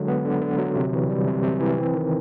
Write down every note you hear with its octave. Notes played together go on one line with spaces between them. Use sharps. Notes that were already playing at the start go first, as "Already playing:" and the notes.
Already playing: D3 F#3 G#3
B3
D3
D3
F#3
C3
E3
G3
C3
C3
E3
C4
D#3